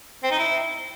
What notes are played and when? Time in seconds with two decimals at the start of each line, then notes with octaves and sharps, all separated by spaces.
0.23 C4
0.31 D#4
0.39 E4